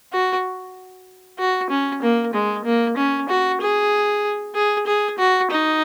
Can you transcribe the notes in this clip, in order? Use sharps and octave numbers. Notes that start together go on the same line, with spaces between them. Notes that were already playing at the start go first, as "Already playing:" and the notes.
F#4
F#4
C#4
A#3
G#3
A#3
C#4
F#4
G#4
G#4
G#4
F#4
D#4